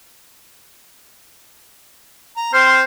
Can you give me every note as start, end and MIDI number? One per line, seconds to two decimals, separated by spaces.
2.37 2.50 82
2.53 2.81 60
2.53 2.84 72
2.53 2.81 84
2.53 2.81 89